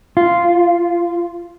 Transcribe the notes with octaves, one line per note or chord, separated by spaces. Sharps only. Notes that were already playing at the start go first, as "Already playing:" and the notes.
F4